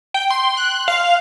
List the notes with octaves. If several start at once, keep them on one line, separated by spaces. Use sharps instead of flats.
G5
C6
F#6
F5